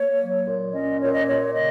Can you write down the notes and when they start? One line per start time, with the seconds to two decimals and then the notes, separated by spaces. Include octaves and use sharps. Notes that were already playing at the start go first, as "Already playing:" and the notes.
Already playing: A#3 C#5
0.19 F#3
0.46 A#2
0.73 C#4 D#5
1.01 A#2 C#5
1.15 D#5
1.27 A#2 C#5
1.55 C#3 D#5